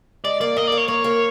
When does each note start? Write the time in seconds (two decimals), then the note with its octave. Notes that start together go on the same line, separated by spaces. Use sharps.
0.25 G#3 D5
0.41 A#3 D5
0.56 A#3 D#5
0.67 A#3 D5
0.78 C#5
0.88 A#3 C#5
1.04 A#3